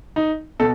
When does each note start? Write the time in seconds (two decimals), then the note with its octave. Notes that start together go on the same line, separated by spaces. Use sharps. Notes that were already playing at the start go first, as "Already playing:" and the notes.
0.16 D#4
0.60 B2 A4